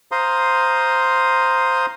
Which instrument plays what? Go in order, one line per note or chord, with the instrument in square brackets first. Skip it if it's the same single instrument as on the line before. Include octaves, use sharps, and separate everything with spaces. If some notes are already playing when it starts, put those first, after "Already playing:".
[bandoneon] C5 F5 A#5 C6 D#6